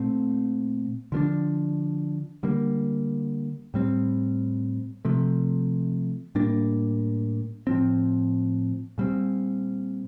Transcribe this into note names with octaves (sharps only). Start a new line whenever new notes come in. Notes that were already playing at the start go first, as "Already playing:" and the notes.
Already playing: A#2 A3 C4
D3 F3 A3 D4
D3 G3 A#3
A2 G3 C4
C3 F3 A3
A2 G3 A#3 D4
A2 F3 C4
A#2 G3 C4